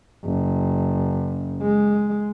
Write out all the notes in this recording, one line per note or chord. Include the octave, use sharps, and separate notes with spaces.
F#1
G#3